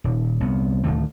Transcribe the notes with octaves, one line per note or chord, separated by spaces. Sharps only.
D#1
C2 B3
D1 C#2 D#3 A3